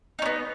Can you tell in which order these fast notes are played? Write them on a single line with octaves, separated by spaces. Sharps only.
D#4 C#4 B3